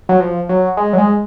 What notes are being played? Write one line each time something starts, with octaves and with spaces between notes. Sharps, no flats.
F#3
F3
F#3
G#3
F#3
G#3